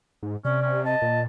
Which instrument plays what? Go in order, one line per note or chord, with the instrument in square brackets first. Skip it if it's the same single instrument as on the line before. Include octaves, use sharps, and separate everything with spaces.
[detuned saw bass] G#2
[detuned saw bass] C3 [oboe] C#4 [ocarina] D5
[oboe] C#4
[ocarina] D#5 [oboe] A5
[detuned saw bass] A#2